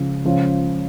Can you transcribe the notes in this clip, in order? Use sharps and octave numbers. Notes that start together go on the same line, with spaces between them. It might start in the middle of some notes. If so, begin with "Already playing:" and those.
Already playing: C#2 C#3 F3
C#2 C#3 F3